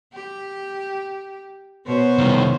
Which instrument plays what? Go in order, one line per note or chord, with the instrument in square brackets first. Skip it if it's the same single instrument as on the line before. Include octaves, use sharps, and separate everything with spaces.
[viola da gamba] G4
B2 C5 C#5
[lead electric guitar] C2 D#3